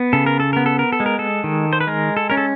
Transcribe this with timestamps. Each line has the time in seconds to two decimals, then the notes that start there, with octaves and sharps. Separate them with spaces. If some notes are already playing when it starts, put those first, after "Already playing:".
Already playing: B3
0.13 C#3 A4
0.26 A#4
0.40 A4
0.53 B3 A#4
0.66 A4
0.79 A#4
0.93 A4
1.00 G#3
1.06 A#4
1.19 A4
1.44 D#3
1.73 C5
1.81 B4
1.87 G#3 A#4
2.17 A4
2.30 C#4 A#4
2.37 A4